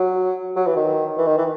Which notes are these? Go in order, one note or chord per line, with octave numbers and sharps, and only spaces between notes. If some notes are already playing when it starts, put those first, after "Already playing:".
Already playing: F#3
F#3
E3
D#3
E3
D#3
E3